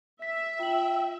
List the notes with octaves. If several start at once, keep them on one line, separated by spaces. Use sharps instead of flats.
E5 B6
F4 G5 F#7